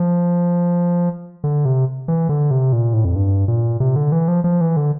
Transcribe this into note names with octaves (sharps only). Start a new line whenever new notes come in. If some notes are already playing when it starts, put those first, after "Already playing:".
Already playing: F3
D3
C3
E3
D3
C3
A#2
A2
F2
G2
A#2
C3
D3
E3
F3
F3
E3
D3